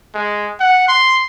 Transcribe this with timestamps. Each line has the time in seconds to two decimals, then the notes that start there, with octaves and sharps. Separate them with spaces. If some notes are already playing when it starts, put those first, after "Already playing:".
0.14 G#3
0.60 F#5
0.88 C6